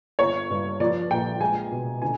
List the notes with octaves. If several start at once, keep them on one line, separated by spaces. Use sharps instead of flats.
G1 C#5
G2
F3 D5
A#1 G5
G#3 G#5
B2
D3 G#5